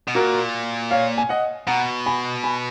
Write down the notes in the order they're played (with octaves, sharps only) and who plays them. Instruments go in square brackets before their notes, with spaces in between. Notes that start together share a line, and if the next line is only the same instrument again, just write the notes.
[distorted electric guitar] B2
[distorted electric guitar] A#2 [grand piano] F#4 A#4
[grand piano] C#5 F5
G#5
D#5 F#5
[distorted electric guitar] B2 [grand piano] F#5 A#5
[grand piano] G#5 B5
G#5 B5